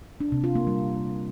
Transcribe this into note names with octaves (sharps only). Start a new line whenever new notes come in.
D4
C3
F4
A#3
G3